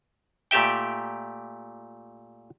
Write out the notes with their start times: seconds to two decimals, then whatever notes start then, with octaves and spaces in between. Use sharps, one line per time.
0.51 A#2 A3 G4 E5 G5